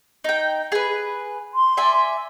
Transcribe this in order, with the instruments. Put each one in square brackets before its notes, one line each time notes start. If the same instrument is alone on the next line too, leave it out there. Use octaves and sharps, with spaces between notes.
[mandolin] D#4 G5
G#4 B4
[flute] C6
[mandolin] D5 E5 G#5